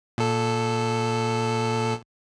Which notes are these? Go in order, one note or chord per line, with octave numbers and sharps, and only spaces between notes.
A#2 A4